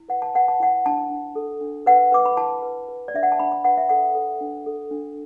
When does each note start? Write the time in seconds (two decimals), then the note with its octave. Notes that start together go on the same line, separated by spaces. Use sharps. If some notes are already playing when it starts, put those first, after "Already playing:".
Already playing: E4
0.09 B4 F#5
0.22 A5
0.35 B4 F#5
0.48 A5
0.60 E4 F#5
0.86 D4 A5
1.10 D4
1.35 A4
1.61 D4
1.86 B4 F#5
2.12 B4 D6
2.26 B5
2.37 E4 A5
2.62 B4
2.89 B4
3.08 D5
3.14 D4 E5
3.23 F#5
3.32 A5
3.40 D4 B5
3.52 B5
3.64 B4 F#5
3.77 E5
3.89 A4 F#5
4.15 A4
4.41 D4
4.66 A4
4.91 D4